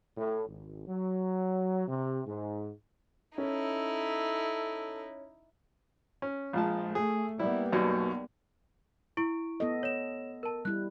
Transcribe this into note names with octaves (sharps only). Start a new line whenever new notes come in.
A2
G#1
F#3
C3
G#2
C#4 D#4 E4 A4
C#4
A#1 F3 G#3 A5
A3 G#4
G3 A#3 B3 E4
B1 F#2 B2
E4 C#6 D7
B3 A4 D#5
C#5 E7
A#4 A5
G3 E4 F#6